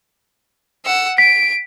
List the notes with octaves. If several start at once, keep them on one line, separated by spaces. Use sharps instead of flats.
F#5 E6
B6 D7